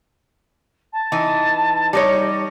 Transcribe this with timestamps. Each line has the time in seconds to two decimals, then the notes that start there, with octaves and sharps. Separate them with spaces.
0.93 A5
1.12 E3 D#4
1.93 G3 D#4 C#5 A#6